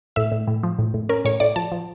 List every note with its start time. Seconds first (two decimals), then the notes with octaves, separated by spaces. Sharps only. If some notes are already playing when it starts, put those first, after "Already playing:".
0.16 A2 E5
0.32 A2
0.47 A2
0.63 F3
0.79 A2
0.94 A2
1.09 C#4 A#4
1.25 A2 C#5
1.40 A2 D5
1.56 F3 A5
1.72 F3